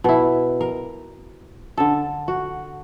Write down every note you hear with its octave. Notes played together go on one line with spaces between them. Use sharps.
B2 E4
A#4
D3 A4
F#4